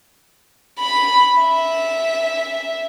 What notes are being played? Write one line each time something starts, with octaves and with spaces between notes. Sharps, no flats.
B5
E5